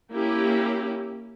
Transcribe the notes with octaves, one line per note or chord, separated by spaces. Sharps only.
A#3 C#4 E4 G4